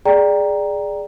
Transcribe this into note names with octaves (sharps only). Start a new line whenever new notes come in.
G#4 D5 G5 A#5